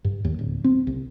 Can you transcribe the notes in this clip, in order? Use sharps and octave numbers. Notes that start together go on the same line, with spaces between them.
G2
D#2
D1
C4
C2